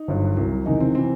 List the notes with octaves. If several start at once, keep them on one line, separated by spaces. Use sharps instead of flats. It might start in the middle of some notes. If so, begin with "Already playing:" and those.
Already playing: D#4
G1 G2 F#3
C2 C3 F#3
F#1 E2 C3 D#3 D#4
C4
C3 E3 C4